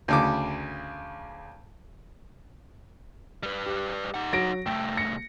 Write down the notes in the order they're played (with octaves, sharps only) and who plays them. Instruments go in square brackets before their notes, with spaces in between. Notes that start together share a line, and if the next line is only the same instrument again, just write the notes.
[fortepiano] D2 C#3 D6
[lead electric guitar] G3 B4
[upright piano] G4
[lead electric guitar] D#4 F#5
[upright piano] F#3 A#6 D7
[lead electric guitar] C2 A3 [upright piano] G5
[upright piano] A#6 C#7